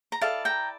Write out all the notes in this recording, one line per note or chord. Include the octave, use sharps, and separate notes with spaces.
A#5
E4 A4 D5 F5 A5
G5 A#5